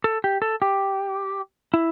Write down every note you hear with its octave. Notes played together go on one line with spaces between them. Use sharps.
A4
G4
A4
G4
E4